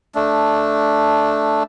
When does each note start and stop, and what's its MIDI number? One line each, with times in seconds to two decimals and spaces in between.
0.15 1.63 57
0.15 1.63 62